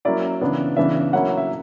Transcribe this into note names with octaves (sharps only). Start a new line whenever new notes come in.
F#3 A#3 C#4 E4 D5
C#3 E3 B3 D4
C#3 E3 B3 D4 E5
F#3 A#3 C#4 E4 F#5
E5